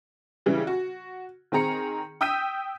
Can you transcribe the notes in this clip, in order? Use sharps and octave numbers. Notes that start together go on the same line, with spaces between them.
C#3 E3 G3
F#4
D#3 C4 G#4 A#5 C#7
G5 D#6 E6 G6 B6 D#7